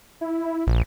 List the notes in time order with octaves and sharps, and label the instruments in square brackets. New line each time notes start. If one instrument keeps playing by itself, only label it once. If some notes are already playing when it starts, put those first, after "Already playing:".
[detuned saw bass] E4
[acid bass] A#1